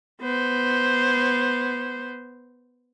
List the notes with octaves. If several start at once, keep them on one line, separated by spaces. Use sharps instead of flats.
B3 C5